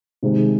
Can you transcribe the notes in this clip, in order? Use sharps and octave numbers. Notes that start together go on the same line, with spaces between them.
C3 D#3 G#3 C4